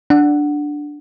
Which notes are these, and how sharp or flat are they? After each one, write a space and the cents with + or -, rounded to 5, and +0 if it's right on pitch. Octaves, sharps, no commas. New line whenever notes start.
D4 +0 F#5 +0